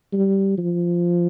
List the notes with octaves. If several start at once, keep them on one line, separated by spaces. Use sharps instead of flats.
G3
F3